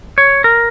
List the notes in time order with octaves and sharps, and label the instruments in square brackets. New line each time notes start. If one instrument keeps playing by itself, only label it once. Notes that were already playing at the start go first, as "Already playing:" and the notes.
[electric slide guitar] C#5
A#4